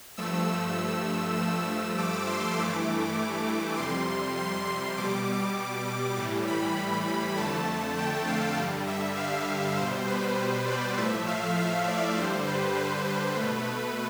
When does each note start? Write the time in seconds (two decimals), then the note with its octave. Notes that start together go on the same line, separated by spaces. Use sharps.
0.17 G2 F3 A3 E6
1.37 G2 F3 A3 E6
1.98 D6
2.28 C6
2.58 G2 E3 A3 D6
3.77 F2 C3 G3 C6
4.38 C6
4.67 C6
4.97 B2 G3 D6
5.27 D6
6.17 A2 E3 G3
6.47 B5
7.37 F2 D3 A3 A5
7.98 G5
8.27 F5
8.57 G2 D3 G3
8.87 E5
9.17 F5
9.77 B2 G3 C5
10.07 B4
10.37 C5
10.67 D5
10.97 A2 F3 A3 E5
11.27 F5
11.57 F5
11.87 D5
12.17 G2 D3 G3 C5
12.46 B4
12.77 B4
13.36 A3
13.42 B2